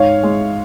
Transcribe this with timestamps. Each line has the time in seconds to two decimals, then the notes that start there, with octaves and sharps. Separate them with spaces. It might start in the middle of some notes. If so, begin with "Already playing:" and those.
Already playing: G#2 C#5 F5
0.23 G#3